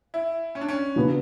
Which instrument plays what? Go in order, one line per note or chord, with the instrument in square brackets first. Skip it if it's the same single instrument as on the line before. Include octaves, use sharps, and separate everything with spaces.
[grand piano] E4
C#4
D4
C#4
[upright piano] C#3 F#3 B3 D4 F#4